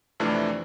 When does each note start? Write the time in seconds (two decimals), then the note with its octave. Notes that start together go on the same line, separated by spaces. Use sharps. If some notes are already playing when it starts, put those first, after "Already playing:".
0.20 F2 C3 E3 A3 D4